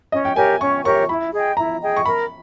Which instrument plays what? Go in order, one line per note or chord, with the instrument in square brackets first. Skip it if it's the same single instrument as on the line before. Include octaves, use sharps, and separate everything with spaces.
[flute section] C#4 [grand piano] D#5
[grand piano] G5
[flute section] G4 A#4 C#5 [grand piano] G#5
[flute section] C#4 [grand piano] C#6
[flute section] G4 A#4 C#5 [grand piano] C#6
[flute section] E4 [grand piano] B5
[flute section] G#4 D#5 G5
[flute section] E4 [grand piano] A#5
[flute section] G#4 D#5 G5
[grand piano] C#6
[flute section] A#4 [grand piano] B5